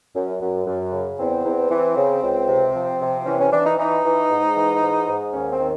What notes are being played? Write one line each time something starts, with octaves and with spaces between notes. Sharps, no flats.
F#2
F#2
F#2
C#3
E2 C4
E2
E3
C#3
C#2
C3
F3
C3
E3 C#4
C#4
E3 D4
D#4
E3 D#4
E3
G#2
E3
G#2
G#2
D#2 C#4
C4
D#3